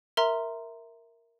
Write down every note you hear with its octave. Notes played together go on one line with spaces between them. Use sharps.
A#4 E5 A#5 C6